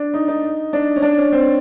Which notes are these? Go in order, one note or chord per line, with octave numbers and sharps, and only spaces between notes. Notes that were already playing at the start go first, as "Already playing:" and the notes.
Already playing: D4
D#4
D#4
D4
C#4
D4
C#4
C4